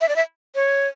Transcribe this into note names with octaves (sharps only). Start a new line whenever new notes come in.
E5
D5
E5
C#5